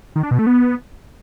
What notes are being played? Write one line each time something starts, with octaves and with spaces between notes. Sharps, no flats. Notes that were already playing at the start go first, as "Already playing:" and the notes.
D#3
D4
B2
A3
B3